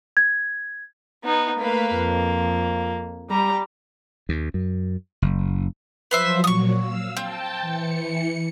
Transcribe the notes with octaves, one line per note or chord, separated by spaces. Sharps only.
G#6
B3 D#4
A3 A#3 B4 F5
F2
G3 A#5
D#2
F#2
F#1
F3 F#3 B4 C5 E5
A#2 F#3 C#6 D#6
F5 E6
C4 G5 A5
E3 C#7